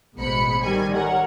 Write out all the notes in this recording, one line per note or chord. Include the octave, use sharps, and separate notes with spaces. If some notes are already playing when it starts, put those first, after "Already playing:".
A1 B2 G#3 C5 B5 C#7
D#3 G3 G#5
A#4 C#5 F#5